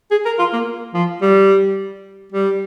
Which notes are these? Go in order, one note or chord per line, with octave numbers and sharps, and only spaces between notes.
G#4
A#4
F4
A#3
F3
G3
G3